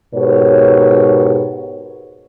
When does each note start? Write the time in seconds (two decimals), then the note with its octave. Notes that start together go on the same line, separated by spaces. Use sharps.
0.15 G#2 B2 G4 A#4 C#5